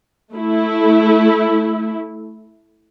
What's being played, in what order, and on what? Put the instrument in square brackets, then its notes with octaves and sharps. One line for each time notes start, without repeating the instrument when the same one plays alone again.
[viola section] A3 E4